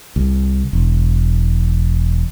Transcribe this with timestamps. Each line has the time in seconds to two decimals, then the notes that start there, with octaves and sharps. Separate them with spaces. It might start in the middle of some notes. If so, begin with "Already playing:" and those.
0.16 C2
0.73 E1